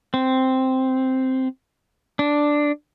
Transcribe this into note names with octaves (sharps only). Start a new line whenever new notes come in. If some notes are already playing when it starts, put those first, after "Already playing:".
C4
D4